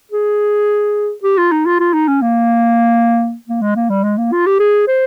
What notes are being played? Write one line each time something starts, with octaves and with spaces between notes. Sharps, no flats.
G#4
G4
F4
D#4
F4
F4
D#4
C#4
A#3
A#3
G#3
A#3
G3
G#3
A#3
F4
G4
G#4
C5